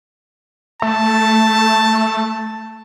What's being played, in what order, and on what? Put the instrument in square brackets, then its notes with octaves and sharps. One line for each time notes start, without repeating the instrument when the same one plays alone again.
[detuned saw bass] A3 [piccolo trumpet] A5